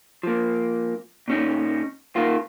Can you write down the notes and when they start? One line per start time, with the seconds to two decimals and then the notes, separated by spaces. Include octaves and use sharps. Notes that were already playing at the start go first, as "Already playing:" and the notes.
0.23 F3 A#3
1.28 A#2 C#4 D#4
2.16 D#3 A#3 F4